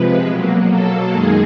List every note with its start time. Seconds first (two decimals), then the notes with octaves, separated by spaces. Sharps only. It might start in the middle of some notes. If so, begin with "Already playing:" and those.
Already playing: C3 F3 G#3 B4
0.27 B2 F#3 A#3
0.69 A4
1.12 F#2 D#3 G#3 G#4